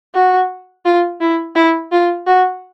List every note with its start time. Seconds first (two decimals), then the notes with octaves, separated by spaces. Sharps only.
0.14 F#4
0.85 F4
1.21 E4
1.56 E4
1.92 F4
2.27 F#4